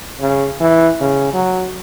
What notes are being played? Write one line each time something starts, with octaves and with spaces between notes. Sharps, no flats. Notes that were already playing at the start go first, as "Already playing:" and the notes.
C#3
E3
C#3
F#3